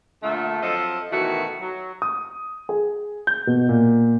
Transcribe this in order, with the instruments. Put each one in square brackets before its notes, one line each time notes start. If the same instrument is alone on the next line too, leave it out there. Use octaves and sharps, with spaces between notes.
[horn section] A#2 D3 A3
F3 F#3 C4 A4 D#5
B2 D#3 E3 A3 F#4
F#3
[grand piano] D#6
G#4
G6
B2
A#2